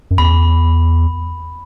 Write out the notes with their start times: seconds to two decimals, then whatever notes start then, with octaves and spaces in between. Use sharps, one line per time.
0.11 F#2
0.18 E2 B5